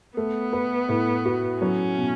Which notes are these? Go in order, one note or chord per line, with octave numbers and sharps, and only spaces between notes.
A3 B3
B4
A2
F#4
F#3 C#4
B2